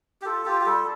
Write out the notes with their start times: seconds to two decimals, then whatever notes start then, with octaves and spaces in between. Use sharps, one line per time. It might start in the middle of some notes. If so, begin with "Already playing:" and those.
0.22 G4
0.26 F4 A4
0.46 F4 G4
0.61 G4
0.66 G3 A4